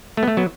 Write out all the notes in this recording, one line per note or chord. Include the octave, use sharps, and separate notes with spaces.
A3
B3
A3
F#3 B3